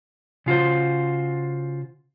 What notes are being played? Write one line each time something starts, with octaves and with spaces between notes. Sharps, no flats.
C#3 F4 F#4 C5